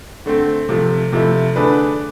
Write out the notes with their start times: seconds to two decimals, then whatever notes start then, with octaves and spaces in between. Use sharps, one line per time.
0.26 D3 A3 C4
0.69 C3 F3 A3
1.12 C3 F3 A3 E4
1.56 D3 A3 D4 G#4 B4